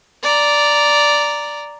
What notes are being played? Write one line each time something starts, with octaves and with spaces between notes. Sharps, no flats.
D5 A#5